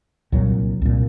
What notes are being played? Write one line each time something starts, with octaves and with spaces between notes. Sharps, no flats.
C2 A#2 F#3
C2 A#2